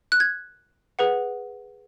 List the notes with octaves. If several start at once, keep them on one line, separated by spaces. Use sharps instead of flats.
F#6
G#6
G#4 B4 F#5